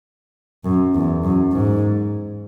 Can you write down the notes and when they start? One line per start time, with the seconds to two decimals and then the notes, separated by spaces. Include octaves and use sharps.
0.64 F#2
0.94 E2
1.23 F#2
1.52 G#2